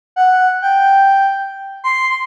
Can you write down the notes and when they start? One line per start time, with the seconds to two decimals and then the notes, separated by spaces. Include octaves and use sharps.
0.16 F#5
0.62 G5
1.84 C6
2.10 C6